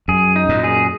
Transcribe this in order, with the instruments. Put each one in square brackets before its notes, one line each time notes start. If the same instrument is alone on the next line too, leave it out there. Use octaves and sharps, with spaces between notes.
[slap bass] F#2 [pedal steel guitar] G#4
[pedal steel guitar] D#4
[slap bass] F#2 A#2
[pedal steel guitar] G#4